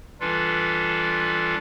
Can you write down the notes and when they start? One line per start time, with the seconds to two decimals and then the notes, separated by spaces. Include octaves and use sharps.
0.20 E3 G3 D4 F4 A4 B4